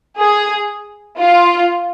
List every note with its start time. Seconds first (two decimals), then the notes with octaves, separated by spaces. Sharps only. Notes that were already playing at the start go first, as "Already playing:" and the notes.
0.18 G#4
1.19 F4